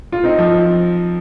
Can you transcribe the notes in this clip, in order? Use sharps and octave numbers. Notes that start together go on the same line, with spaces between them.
F4
C4 D#4
F3